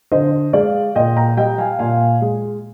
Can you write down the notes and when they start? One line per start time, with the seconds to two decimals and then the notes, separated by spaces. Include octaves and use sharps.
0.12 D3 C5 D#5
0.53 G#3 D5 F5
0.95 A#2 D#5 G5
1.17 G5 A#5
1.37 G3 D#5 G5
1.58 F5 G#5
1.79 A#2 F5 G#5
2.22 G#3